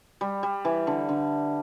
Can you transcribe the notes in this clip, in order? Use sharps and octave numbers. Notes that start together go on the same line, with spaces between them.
G3
G3
E3
D3
D3